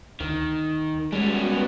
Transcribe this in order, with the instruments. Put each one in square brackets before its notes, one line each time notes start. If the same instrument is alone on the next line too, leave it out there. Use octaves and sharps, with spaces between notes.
[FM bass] D2 [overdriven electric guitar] D#3
[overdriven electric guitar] G3 C#4 [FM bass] G#3 [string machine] B3 F#4